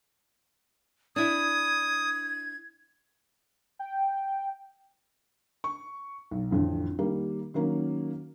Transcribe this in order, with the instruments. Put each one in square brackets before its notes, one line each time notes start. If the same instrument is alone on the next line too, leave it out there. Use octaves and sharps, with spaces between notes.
[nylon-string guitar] D4 E4 [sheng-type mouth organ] D#6 [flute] G#6
[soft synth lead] G5
[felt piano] C#6
B1
A1 F2 D3
D#3 G3 A#3
D#3 F#3 A#3 C#4